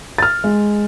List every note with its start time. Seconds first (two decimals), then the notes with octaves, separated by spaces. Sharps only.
0.18 F6 A6
0.44 G#3